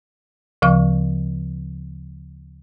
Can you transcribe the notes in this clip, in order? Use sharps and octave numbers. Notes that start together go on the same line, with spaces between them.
D2 C#3 F3 F5 C#6